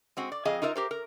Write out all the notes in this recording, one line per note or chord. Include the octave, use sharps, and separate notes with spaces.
G#3 C4 F#4
D5
F2 G#4 D#5 F5
D#4 F4 A#4 E5
G4 A#4 C5
A#4